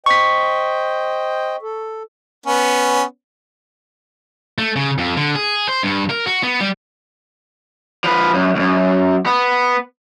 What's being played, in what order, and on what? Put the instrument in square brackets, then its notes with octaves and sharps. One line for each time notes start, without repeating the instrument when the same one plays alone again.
[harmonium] C5 D#5 G5 [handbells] C#6 B6
[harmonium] A4
[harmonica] B3 C#4
[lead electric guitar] A3
C#3
F2
D3
G#4
C5
G2
A#4
F#4
B3
G3
[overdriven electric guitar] F3 B4
F#2
C#2 F#2
B3